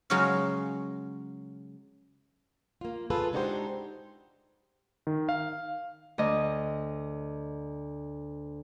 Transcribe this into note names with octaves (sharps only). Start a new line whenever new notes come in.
C#3 F#3 G#3 C#5 F5
A#3 F4
F4 G#4 A4 B4
G#3 D4 D#4 F#4 G4 C5
D#3
F5
D2 D#5